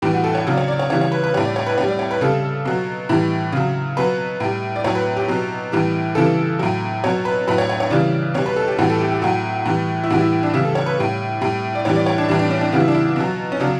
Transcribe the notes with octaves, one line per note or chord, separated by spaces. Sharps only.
A2 E3 G3 G4
F#4
A4
C#5
C#3 F#3
D5
C#5
D5
C#5
C#3 E3 G3 C#5
C#5
B4
B4
A2 G3 C#5
D5
C#5
B4
A2 G3 C#5
D5
C#5
B4
C#3 G3 A4
B2 F#3
A2 E3 G3
C#3 F#3
B2 F#3 B4
A2 G3
D5
A2 F#3 C#5
B4
G4
B2 F#3
A2 E3 G3
C#3 E3 G3 A4
A2 F#3
B2 F#3 C#5
B4
A2 F#3 B4
C#5
C#5
C#5
C#3 E3 G3 D5
B2 G3 C#5
B4
A4
G4
A2 E3 G3 F#4
A4
G4
G4
A2 F#3 F#4
A2 E3 G3
E4
A2 E3 G3 F#4
E4
D4
C#3 E3 G3 E4
A4
C#5
B4
A2 G3
A2 G3
D5
A2 E3 G3 C#5
D5
C#5
D4
A2 E3 G3 D4
D4
C#4
D4
C#3 E3 G3 F#4
E4
D4
E4
B2 F#3
C#4
C#3 F#3 D4